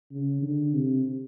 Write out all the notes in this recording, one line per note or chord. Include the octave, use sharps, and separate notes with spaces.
C#3
D3
C3